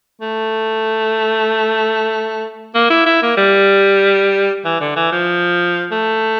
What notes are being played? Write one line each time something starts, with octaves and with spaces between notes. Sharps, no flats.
A3
A#3
E4
E4
A#3
G3
E3
D3
E3
F3
A3